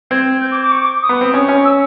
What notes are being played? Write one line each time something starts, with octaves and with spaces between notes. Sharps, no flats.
C4 G#6
G6
D6
D6
C#6
D6
D#6
B3
C4
C#4
C#4
E6